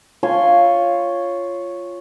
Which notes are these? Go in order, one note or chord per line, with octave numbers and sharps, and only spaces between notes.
F4 C#5 G#5 C6